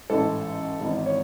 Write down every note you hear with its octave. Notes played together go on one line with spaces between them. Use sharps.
A1 G#2 E3 A4
G#1 G#2 E3
C#5